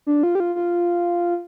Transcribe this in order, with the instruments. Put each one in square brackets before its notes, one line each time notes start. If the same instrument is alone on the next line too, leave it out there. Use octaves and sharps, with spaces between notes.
[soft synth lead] D4
F4
G4
F4
F4